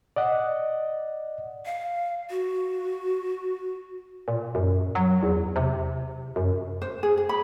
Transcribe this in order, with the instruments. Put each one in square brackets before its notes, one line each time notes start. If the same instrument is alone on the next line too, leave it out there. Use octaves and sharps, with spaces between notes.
[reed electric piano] D5 D#5 F#5
[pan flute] F5
F#4
[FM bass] A#2
F#2
F#3
E2
C3
F#2
[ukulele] C5
G#4
G#4
B5